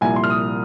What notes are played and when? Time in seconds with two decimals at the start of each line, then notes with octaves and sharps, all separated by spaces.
0.01 C2 A#2 F3 G#5
0.16 C6
0.24 F6
0.30 D#6